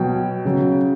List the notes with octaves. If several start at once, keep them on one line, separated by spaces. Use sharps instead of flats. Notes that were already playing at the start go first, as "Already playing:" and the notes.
Already playing: B2 F#3 G5
C#3 F#3